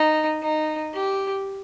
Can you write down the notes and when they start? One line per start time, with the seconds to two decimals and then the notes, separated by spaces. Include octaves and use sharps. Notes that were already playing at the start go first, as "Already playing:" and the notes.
Already playing: D#4
0.42 D#4
0.94 G4